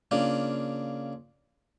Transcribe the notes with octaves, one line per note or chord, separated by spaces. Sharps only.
C#3 A#3 D4 F4